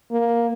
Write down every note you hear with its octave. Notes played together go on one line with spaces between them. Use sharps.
A#3